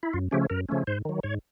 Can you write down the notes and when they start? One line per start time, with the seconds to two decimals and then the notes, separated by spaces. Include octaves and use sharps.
0.03 E4
0.13 F#2 F4
0.31 C#3 F3 A3 C#4 G4
0.50 F#2 A#4
0.69 C#3 F3 A3 C#4
0.87 G#2 C5
1.05 D#3 F#3
1.23 G#2 C#5